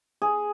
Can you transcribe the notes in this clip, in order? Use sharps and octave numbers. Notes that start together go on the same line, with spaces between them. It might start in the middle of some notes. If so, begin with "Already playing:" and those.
G#4